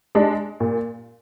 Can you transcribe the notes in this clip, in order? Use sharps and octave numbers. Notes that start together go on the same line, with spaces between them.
G#3 D4
A#2